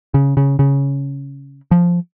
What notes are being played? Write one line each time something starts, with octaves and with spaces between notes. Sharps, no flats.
C#3
C#3
C#3
F3